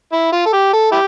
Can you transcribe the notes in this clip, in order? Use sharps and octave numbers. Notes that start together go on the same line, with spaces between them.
E4
F4
A4
G4
A4
E4 G4